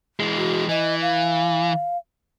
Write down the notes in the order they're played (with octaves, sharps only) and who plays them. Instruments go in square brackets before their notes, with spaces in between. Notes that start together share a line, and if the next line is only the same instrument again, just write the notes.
[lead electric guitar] E3 G#3
[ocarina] F#4
[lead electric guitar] E3 [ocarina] D#5
[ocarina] F5